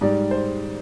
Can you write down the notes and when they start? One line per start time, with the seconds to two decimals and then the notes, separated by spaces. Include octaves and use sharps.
0.01 G#2 G3 D5
0.31 C5